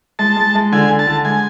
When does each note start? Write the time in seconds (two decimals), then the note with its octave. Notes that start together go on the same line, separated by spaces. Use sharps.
0.19 G#3 A5
0.37 G#3
0.55 G#3
0.72 D3 G#5
0.90 D3
0.99 A5
1.07 D3
1.25 G#3 G#5